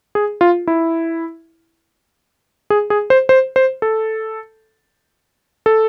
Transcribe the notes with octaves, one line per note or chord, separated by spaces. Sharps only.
G#4
F4
E4
G#4
G#4
C5
C5
C5
A4
A4